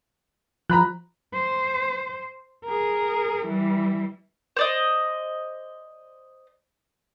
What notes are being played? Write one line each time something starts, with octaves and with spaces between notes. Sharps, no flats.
F3 A#5 B5 F#6
C5
G#4 A#4
E3 G3
C5 D5 D#5